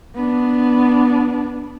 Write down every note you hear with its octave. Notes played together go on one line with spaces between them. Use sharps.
B3 D4